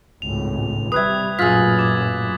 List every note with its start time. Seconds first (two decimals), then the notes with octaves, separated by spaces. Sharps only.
0.22 G#1 C#2 A2 F7
0.92 C3 G3 B4 E5 D#6 F#6 G#6
1.39 A1 F#2 A#2 F4 G#4 E6 A6 B6
1.79 D6 G#6